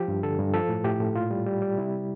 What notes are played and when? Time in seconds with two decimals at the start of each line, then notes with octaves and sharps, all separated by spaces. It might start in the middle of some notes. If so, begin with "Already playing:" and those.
Already playing: F3 G4
0.08 G2
0.23 D3 A4
0.39 G2
0.54 F3 A4
0.69 A2
0.84 A2 G4
1.00 A2
1.16 A#2 F4
1.31 G3
1.46 G3
1.62 G3
1.77 C3 E4